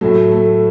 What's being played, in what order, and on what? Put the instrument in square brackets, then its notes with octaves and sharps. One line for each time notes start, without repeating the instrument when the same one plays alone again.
[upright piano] A2 F#3 A3
A3